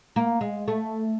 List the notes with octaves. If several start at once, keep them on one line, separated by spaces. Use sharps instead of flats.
A#3
G#3
A3